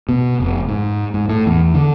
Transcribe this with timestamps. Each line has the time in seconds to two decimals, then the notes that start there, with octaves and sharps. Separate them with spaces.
0.09 B2
0.40 F1
0.69 G#2
1.14 G#2
1.29 A2
1.46 E2
1.74 D3